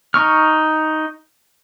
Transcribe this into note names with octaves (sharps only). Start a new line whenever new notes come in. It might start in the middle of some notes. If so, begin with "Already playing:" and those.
D#4 C#6 F6